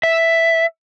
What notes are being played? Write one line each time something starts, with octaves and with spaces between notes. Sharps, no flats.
E5